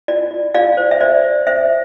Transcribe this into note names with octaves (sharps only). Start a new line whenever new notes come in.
F4 D5
F4
F4 D5 F5
C5
E5
C5 D5
C5
C5 E5